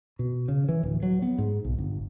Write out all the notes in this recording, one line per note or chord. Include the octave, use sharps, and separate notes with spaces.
B2
C#3
E3
D1
F#3
B3
G#2
B1
G1